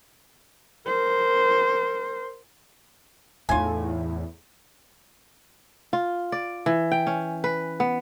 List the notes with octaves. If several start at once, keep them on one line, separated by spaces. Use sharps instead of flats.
A#4 C5
E2 A2 A3 D#4 F4 G#5
F4
D5
E3
G5
C#4
B4
B3